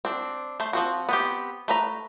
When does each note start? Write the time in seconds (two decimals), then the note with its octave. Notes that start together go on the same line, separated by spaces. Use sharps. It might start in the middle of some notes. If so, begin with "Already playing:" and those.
0.05 C4 D4
0.60 A3 C5
0.73 F3 C4 F#4
1.09 B3 C4 G4
1.68 A3 B4 A#5